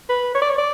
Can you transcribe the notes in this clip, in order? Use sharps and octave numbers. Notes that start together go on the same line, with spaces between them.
B4
C#5
D5
C#5
D5